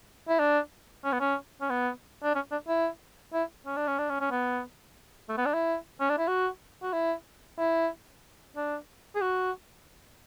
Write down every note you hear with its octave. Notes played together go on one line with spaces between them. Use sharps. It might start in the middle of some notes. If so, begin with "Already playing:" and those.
E4
D4
C#4
B3
C#4
C#4
B3
D4
C#4
D4
E4
E4
C#4
D4
C#4
D4
C#4
C#4
B3
A3
B3
D4
E4
C#4
D4
E4
F#4
F#4
E4
E4
D4
G#4
F#4